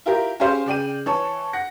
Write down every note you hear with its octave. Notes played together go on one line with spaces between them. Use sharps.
E4 F4 G4 A#4
C#4 G4 G#4 C5 F5
C#3 D5 G5 D#7
E3 C#5 A5
F#5 A#6